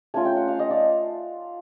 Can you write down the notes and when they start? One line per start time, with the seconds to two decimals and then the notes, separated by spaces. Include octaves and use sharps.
0.14 A3 C#4 F4 G#5
0.25 G5
0.37 F#5
0.48 F5
0.59 D#5
0.70 D5